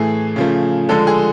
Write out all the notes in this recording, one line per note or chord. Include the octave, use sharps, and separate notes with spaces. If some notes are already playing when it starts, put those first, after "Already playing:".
Already playing: A2 E3 A3 G#4
C#3 F3 A3
D3 F3 G#3 A4
G#4